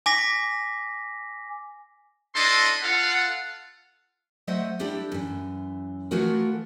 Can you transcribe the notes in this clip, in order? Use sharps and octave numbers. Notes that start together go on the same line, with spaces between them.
G#5 D6 A#6 B6
D4 E4 A4 D#5 C6
F4 A4 F5 F#5
F#3 A3 C5 D#5 E5 F#5
G3 D4 E4 G4 A4
F#2 E3
E3 F3 A3 F4 F#4 A#4